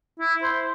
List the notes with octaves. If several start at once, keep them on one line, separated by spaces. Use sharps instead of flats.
E4
C5